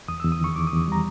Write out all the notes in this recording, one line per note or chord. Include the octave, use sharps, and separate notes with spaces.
E2 D#6
E2 E6
D#6
D#3 C#6
E2 D6
D#6
E2
G3 A#5